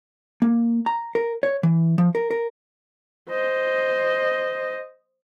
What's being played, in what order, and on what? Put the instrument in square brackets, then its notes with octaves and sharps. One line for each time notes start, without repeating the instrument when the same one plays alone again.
[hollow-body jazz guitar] A#3
A#5
A#4
C#5
E3
F3
A#4
A#4
[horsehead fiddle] C5 D#5